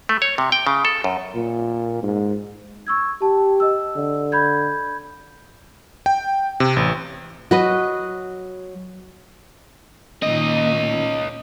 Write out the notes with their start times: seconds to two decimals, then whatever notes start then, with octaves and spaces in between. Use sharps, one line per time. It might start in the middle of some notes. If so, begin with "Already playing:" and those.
0.09 A3
0.22 C#5
0.38 C3
0.52 G5
0.67 C#3
0.85 A4
1.04 F#2
1.35 A#2
2.03 G#2
2.87 C#6 E6 G#6
3.22 G4 A5
3.60 D#5 E6
3.96 D3
4.32 B5 G6 G#6
6.06 G5
6.60 C3
6.76 A1
7.51 F#3 F#4 B4 D#5
10.22 A#2 D#3 A#3 C#4 D#5